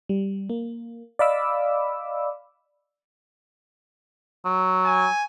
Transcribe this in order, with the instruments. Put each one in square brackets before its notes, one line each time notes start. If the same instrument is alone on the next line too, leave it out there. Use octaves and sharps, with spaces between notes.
[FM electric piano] G3
A#3
D5 D#5 F5 B5 D6 E6
[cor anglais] F#3
[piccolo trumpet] G#5